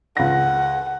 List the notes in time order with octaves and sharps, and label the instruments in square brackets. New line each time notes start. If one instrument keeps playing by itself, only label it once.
[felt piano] C#2 A#6 [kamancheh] F#5